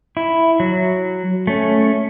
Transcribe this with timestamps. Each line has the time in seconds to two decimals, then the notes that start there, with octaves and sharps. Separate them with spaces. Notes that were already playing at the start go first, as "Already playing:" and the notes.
0.17 E4
0.60 F#3
1.47 A3 C#4